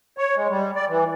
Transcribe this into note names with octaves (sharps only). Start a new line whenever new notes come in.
C#5
G#3
G3
D5
E3